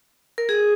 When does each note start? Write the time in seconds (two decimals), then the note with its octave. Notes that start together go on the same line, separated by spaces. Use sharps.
0.38 A#4
0.49 G#4